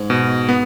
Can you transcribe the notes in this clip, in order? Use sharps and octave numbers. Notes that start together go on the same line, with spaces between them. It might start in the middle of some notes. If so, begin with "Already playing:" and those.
Already playing: G#2
B2
B3